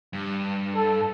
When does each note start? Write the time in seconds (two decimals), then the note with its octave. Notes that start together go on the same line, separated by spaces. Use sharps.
0.13 G2
0.75 A4